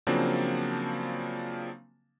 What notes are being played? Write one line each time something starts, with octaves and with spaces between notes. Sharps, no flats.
C#3 F3 F#3 A#3 C4 D4